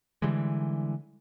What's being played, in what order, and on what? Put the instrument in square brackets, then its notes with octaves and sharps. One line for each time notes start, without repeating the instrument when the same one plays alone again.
[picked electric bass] D3 E3 G3 G#3